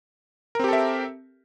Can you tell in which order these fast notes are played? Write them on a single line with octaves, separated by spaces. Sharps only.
A#4 C4 G4 A4 E5